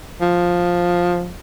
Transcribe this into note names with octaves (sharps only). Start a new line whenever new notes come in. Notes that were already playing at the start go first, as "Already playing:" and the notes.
F3